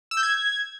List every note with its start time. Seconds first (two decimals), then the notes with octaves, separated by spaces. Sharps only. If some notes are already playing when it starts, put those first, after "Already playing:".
0.11 E6
0.17 G6
0.23 G#6